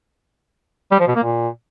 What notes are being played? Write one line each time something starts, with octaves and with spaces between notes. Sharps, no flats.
G3
F3
B2
A#3
A#2